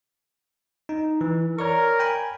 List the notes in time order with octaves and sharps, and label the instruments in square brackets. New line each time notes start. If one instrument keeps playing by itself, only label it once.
[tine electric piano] D#4
E3
[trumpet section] A#4 [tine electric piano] C#5 D5 C#6
[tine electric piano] G5 G#5 B5